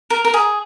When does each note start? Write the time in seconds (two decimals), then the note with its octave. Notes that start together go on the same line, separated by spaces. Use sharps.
0.10 A#4
0.25 A#4
0.34 G#4